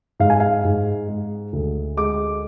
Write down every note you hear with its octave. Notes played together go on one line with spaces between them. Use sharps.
G#2 F5
G#5
F5
G#2
G#3
D2
G#3 D6